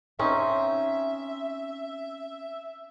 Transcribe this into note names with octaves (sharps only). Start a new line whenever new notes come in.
C4 C#4 D#4 E5